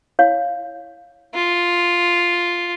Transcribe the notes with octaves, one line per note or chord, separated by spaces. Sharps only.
E4 C#5 F5
F4